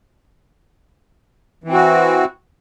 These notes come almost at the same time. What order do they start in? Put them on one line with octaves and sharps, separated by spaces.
E3 C4 F#4